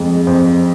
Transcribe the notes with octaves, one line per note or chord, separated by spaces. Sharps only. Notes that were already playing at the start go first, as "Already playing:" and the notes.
Already playing: F2 G#3
F2 C5